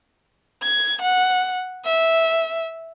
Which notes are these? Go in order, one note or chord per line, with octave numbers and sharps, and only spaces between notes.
G#6
F#5
E5